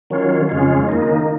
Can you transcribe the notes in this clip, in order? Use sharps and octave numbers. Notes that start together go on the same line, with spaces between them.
D#3 F#3 C#4 F4
F2 C#3 G#3 C#4 F4
D#3 A#3 D#4